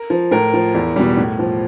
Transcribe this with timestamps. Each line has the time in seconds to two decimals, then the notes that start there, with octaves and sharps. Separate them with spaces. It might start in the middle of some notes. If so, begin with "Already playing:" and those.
Already playing: A#4
0.10 F3
0.31 A2 A#4
0.54 F3
0.74 E2
0.96 B2 G3
1.17 A2
1.39 F3